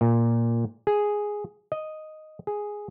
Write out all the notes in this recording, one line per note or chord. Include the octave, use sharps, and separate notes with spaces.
A#2
G#4
D#5
G#4